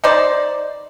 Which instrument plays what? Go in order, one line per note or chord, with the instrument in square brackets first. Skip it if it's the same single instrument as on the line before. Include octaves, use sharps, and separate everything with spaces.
[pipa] D#4 C5 D5